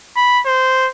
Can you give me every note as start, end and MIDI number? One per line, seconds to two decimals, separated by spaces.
0.16 0.41 83
0.46 0.88 72